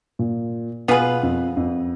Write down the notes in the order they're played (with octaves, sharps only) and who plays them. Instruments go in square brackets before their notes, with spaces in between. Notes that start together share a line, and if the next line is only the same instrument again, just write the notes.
[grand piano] A#2
[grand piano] B2 [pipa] B3 F4 G#4 B4
[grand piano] F2
F2